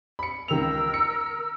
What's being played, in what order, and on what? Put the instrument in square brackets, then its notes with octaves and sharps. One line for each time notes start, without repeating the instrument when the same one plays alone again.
[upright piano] B5 C#7
[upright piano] C#2 D#3 F7 [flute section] A#4 E6
[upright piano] C#7